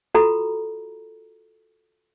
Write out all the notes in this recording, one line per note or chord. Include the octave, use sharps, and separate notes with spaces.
F4 F#4 A4 A#5 B5